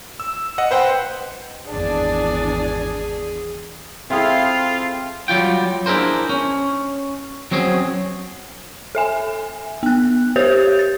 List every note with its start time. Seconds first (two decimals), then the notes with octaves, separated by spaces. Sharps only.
0.20 E6
0.58 D#5 F#5
0.71 B4 C5 F#5 G5
1.69 G#1 E2 D4 G#4 D5
4.10 C4 E4 F4 G#4 A4 F5
5.28 F#3 G3 F4 G5
5.86 D4 E4 G#4 A#4 C5
6.29 C#4
7.51 F#3 C4 C#4 G#4
8.95 A4 E5 G#5
9.83 B3 F#6
10.36 G4 C5 C#5 G6 F7
10.79 A6